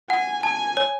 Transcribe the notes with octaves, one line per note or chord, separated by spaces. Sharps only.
F#5 G#5
G#5 A5
C#5